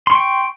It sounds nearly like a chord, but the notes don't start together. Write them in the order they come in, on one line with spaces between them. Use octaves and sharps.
C6 C#6 G5